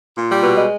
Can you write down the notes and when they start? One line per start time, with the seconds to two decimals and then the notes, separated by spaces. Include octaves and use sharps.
0.14 A#2
0.29 G3
0.43 B2
0.57 G#3